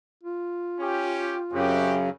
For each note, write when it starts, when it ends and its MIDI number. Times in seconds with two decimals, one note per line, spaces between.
0.23 1.93 65
0.80 1.37 61
0.80 1.37 67
1.52 2.10 42
1.52 2.10 49
1.52 1.97 60
1.52 1.97 66
1.52 1.97 67